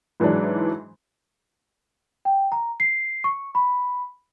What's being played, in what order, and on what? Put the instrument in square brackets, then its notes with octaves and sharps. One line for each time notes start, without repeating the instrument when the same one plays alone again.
[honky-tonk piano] G#2 E3 F#3 G#3 D4
[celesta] G5
A#5
C7
C#6
B5